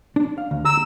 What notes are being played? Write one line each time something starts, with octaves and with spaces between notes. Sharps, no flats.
D4
F5
D2
A#5 E6